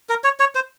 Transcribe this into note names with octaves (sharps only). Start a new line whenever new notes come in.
A#4
C#5
C#5
C5